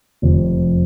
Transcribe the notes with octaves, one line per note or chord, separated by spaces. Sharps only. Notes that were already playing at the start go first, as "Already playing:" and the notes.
F1 F2 C3